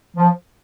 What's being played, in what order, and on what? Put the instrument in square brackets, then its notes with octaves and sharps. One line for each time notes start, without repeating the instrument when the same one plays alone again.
[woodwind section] F3